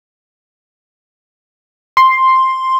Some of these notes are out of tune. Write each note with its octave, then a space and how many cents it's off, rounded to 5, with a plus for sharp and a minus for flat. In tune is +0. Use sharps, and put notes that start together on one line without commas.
C6 +5